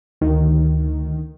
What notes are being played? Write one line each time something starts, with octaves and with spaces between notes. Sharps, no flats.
D2 D#3